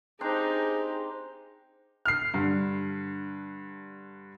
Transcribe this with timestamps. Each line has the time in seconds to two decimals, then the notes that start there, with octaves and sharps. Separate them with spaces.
0.21 C4 D4 D#4 G4 G#4 A#5
2.05 F6 C7
2.34 G2 D3